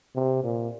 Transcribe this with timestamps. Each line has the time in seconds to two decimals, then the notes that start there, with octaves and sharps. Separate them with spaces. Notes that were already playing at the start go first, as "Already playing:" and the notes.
0.15 C3
0.44 A#2